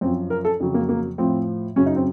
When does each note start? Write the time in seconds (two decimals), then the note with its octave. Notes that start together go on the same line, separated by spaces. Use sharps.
0.01 F#2 F3 C4
0.30 A#4
0.45 A4
0.60 F2 C#3 F#3
0.74 A#3
0.89 A#3
1.18 A2 F3 C4
1.76 F#2 C#3 F#3 C#4
1.86 D#4
1.96 C4